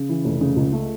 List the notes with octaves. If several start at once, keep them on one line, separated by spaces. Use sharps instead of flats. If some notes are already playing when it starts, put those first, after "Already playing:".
Already playing: C#3
E3
F1
C#3
C#2
A3